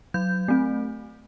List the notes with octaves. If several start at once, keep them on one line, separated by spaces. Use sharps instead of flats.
F#3 G6
A3 C4